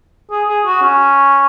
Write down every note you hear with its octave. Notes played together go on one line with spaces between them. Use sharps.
G#4
G#4
F#4
C#4